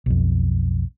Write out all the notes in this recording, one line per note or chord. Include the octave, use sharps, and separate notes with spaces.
B1 F2